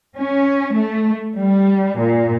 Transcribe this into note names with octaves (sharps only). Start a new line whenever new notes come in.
C#4
A3
G3
A#2